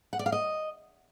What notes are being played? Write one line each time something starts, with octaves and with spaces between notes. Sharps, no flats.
F#5
D5
F5
D#5